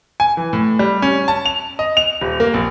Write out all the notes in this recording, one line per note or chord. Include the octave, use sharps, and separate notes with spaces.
G#5
E3
A2
G3
C#4
A5
F7
D#5
F7
D#1
A#3
A#1